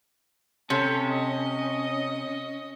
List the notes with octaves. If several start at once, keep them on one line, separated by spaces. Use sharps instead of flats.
C3 C#4 A4
D#5